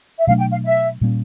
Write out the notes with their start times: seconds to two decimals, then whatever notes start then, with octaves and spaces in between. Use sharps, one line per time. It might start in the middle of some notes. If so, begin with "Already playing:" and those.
0.19 E5
0.27 B2 F#3 A3 D4 F5
0.39 G5
0.51 F5
0.65 E5
1.01 A#2 G3 A#3 C#4